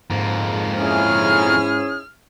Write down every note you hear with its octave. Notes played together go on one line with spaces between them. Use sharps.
F2 G#2 A#3
C#4 E4 G#4 F6